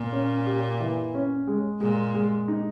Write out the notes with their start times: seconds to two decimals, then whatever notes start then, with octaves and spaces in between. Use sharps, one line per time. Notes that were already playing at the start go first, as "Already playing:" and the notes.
Already playing: A#2
0.12 C#4
0.46 G4
0.80 E3
1.14 C#4
1.47 G#3
1.81 A#2 G#3
2.14 G#3
2.48 D#4